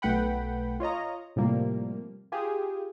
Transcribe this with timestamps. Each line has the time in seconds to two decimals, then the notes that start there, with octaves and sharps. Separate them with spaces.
0.02 B1 A3 B4 F#5 G5 B5
0.80 F4 C#5 D#5 A#5
1.36 A2 C3 F3 G3 A#3
2.32 F4 G4 G#4